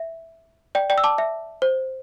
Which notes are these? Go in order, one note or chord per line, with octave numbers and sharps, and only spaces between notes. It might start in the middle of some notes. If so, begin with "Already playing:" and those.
Already playing: E5
D5 G5
D5 G5
E6
A5 D6
E5
C5